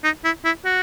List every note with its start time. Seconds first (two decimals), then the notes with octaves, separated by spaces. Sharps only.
0.04 D#4
0.24 E4
0.45 E4
0.65 F#4